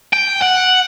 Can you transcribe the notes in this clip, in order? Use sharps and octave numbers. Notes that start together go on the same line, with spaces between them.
G5
F#5